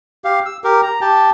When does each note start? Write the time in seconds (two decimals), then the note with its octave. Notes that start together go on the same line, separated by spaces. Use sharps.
0.24 G4 F5
0.46 E6
0.64 G4 A#4
0.82 A#5
1.01 G4 G5 A5